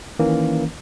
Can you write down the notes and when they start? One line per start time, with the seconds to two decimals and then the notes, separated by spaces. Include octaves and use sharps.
0.19 D#3 E3 A#3 C#4